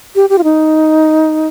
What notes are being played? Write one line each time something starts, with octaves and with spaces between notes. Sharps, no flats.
G4
G4
F4
D#4